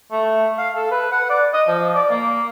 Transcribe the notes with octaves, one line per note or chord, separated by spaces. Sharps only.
A3
F5
A4
B4
F#5
D5
D#5
F3
D5
A#3